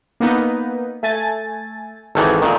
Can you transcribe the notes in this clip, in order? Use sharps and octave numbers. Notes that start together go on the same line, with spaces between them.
A#3 B3 D#4
A3 G#5 A6
G#1 D#3 E3 A4
A#2 D#3